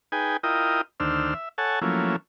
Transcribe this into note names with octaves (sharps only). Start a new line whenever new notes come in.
D#4 G#4 B4 G5 G#5
E4 F4 A#4 D#5 G5 D#6
D2 D#3 D4 C5 E6 F6
E5
A4 C#5 F#5 G#5 A5
F3 F#3 A3 A#3 C#4 E4